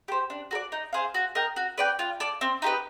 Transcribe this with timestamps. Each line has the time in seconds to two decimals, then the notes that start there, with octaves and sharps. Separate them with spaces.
0.08 G4 C5
0.30 D4
0.51 F#4 A4 D5
0.72 D#4
0.93 G#4 C5 F5
1.14 F#4
1.35 A#4 D#5 G5
1.56 F#4
1.78 B4 D5 G5
1.99 F4
2.20 A4 D5
2.41 C4
2.62 D#4 G4 B4